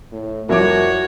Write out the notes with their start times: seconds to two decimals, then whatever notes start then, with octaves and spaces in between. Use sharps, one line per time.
0.12 A2
0.49 C2 F2 F#4 A#4 C#5 D6